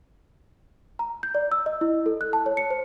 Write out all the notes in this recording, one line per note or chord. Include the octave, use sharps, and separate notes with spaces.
A#5
G6
D5
E6
D#5
E4
A4
F#6
A5
C#5
C#7
C5